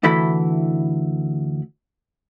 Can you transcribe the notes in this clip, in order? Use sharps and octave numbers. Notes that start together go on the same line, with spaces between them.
D2 E3 E4 A4 B5